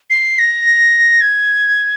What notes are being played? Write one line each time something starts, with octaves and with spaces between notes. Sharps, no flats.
C7
A#6
G#6